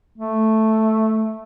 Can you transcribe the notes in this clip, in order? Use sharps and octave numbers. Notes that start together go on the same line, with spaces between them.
A3